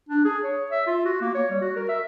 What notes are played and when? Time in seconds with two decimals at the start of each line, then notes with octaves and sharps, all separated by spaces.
0.09 D4
0.25 G#4
0.44 C#5
0.71 E5
0.87 F4
1.05 F#4
1.21 A#3
1.35 C#5
1.50 G3
1.61 F#4
1.76 A#4
1.89 E5